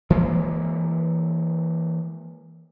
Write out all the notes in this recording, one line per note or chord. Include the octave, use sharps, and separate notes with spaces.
E3 G#3 A#3